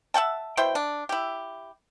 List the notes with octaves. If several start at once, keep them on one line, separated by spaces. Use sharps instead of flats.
E5 F#5 G5 A5
B2 E4 C5 G5
D4
E4 G4